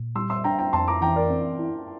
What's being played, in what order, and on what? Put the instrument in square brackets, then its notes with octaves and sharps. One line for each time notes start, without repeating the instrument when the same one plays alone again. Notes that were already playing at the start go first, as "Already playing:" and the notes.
Already playing: [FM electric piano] A#2
[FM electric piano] G3 [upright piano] C6 E6
[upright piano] C6 E6
[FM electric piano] D4 [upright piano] G5 A#5
[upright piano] G5 A#5
[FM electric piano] F2 [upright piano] A5 C6
[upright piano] A#5 D6
[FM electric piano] E3 [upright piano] G5 A#5
[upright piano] A#4 D5
[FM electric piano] C4
E4